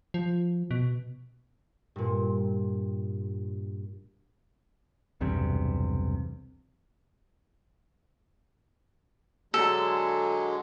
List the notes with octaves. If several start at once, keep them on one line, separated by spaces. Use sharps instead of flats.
F3
B2
G2 A#2
B1 E2 G2 C3
D3 F#3 G#3 A4